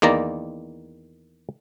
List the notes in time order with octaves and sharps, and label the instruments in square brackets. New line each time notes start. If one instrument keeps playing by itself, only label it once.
[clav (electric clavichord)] E2 D#3 A#3 D5 A#5